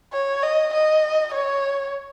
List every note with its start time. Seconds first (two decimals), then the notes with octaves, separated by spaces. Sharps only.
0.13 C#5
0.43 D#5
0.74 D#5
1.34 C#5